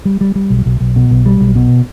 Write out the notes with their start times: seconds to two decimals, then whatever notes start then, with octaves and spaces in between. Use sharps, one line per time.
0.05 G3
0.21 G3
0.35 G3
0.50 B1
0.66 B1
0.81 B1
0.96 B2
1.11 B1
1.26 G3
1.41 B1
1.55 B2